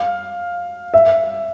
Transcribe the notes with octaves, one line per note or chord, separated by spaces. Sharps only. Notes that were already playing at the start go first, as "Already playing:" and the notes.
Already playing: F5
E5